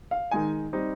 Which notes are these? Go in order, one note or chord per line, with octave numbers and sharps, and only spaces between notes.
F5
D#3 G#3 D#4 G#5
G3 C4 D#4